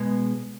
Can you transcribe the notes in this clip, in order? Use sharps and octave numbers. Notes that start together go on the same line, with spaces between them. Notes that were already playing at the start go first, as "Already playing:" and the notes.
Already playing: B2 G#3 B3